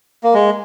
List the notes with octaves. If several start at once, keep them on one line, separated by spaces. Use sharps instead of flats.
A#3
G#3